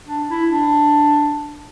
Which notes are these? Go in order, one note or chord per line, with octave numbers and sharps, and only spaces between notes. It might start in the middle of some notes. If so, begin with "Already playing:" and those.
D4
E4
D4